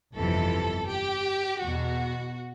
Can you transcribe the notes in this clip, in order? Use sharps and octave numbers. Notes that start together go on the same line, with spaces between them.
G1 F2 C3 E3 A4
G4
E2 B2 F#4